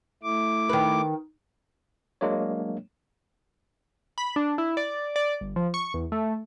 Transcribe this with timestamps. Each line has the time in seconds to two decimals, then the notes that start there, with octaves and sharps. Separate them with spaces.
0.23 A3 E4 D6
0.69 D#3 B4
2.21 F#3 G#3 A#3 D4 C#5
4.18 B5
4.36 D4
4.58 E4
4.77 D5
5.16 D5
5.41 G1
5.56 F3
5.74 C#6
5.94 E2
6.12 A3